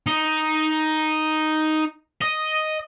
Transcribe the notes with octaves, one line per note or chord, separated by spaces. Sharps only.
D#4
D#5